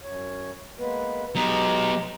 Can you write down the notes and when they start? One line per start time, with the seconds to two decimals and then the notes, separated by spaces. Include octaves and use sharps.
0.02 F#2 C#5
0.79 G#3 A#3 B3 B4
1.35 F#3 G#3 B3 G4 A#5